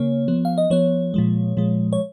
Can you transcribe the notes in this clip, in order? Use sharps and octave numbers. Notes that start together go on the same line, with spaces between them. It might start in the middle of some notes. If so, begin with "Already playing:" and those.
Already playing: C#3 A#3 C#5
F3 B3
F5
D#5
F3 B3 C#5
A#2 F3 G#3
A#2 F3 G#3
C#5